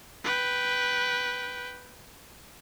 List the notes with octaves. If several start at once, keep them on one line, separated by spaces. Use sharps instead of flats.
B4 G5